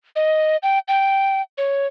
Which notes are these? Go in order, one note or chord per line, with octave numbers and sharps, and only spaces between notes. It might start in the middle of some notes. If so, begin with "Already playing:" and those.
D#5
G5
G5
C#5